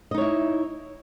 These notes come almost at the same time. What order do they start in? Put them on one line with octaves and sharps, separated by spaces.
D#5 D#4 C#5 E4